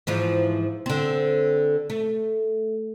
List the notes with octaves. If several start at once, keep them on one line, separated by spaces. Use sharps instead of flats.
G#2 E3 F3
D3 C4
A3